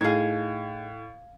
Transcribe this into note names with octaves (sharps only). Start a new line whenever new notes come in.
A2 D#4 G#4 F5 G#6